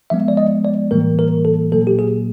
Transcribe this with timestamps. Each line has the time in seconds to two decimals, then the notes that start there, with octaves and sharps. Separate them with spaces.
0.10 F3 G#3 B3 E5
0.28 D5
0.37 D#5
0.65 D5
0.91 A2 E3 G3 A#3 A#4
1.19 A#4
1.45 A4
1.72 A#2 F#3 A#3 A4
1.87 G4
1.99 G#4